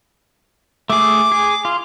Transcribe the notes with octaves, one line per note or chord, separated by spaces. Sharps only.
A3 G#4 D6
G#4
F4